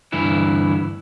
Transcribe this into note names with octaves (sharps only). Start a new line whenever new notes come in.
D2 G2 E3 E4